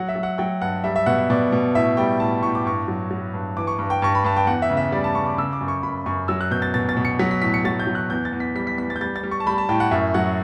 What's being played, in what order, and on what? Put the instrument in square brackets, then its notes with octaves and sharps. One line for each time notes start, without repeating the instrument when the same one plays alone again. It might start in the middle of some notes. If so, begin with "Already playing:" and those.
Already playing: [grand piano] F#3 F#5
E5
F#3
F#5
F#3 G5
G2 F#5
G3 E5
E5
B2 F#5
E5
B2 D5
B2
A2 E5
G3 G5
A2 A5
A2 C#6
D6
G2 C#6
F#3
F#3
G2
E3 D6
C#6
G2
G5
G2 C#6
B5
G2 A5
G5
E2 F#5
E5
C#3
E5
G3 D5
A5
C#3 C#6
D6
C#3 E6
D6
F#2
C#6
F#2 B5
F#2 C#6
F#3 E6
F#6
B2 G6
A6
B2 A6
A6
B2
C#7
F#3 B6
B6
A2 B6
C#7
F#3 A6
G6
F#3
F#6
E2 G6
A6
E2
B6
G3 B6
B6
E2 B6
A6
G6
G3 A6
A6
G3
C#6
A5
G3 B5
A5
A2 G5
F#5
F#2 E5
F#3 F#5